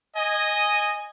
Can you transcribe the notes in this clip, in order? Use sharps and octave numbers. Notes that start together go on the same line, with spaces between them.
D#5 G#5